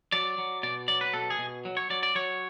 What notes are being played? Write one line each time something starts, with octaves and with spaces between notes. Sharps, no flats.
F#3 D5
F#3
B2 D5
F#3 D5
B4
B2 A4
G#4
B2
F#3
C#5
F#3 D5
D5
F#3 C#5